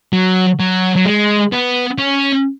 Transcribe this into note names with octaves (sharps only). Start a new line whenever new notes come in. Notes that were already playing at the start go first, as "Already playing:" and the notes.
F#3
F#3
F#3
G#3
B3
C#4